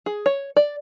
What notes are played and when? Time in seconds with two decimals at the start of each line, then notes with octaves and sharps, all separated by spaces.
0.06 G#4
0.26 C#5
0.56 D5